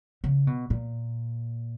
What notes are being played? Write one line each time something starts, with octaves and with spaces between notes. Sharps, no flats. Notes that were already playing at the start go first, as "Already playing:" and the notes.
C#3
B2
A#2